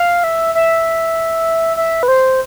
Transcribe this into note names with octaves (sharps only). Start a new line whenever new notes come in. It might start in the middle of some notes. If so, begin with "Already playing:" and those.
Already playing: F5
E5
E5
E5
B4
C5